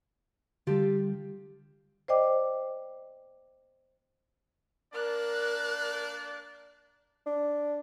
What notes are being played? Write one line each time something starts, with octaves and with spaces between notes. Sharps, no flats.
D3 G3 F4 G4 A4
C5 D5 D#5 G5 D6
A#3 D4 A#4 D5 F#6
D4